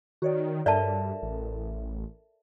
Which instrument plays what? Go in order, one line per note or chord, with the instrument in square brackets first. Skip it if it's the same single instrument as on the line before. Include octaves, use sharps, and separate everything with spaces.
[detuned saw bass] D#3 [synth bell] F#4 C#5 D5
[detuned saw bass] G2 [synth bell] A4 A#4 E5 [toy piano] D5 A5
[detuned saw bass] A1